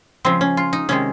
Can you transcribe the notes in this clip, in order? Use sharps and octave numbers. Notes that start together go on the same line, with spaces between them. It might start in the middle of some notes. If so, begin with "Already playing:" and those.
C#3 F3 G#3 C4
C#4
F4
D#4
C3 D#3 G#3 C#4